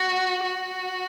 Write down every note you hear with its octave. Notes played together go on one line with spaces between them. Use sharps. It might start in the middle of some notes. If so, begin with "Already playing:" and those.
Already playing: F#4
F#4